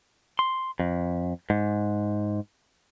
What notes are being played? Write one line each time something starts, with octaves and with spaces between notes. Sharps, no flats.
C6
F2
G#2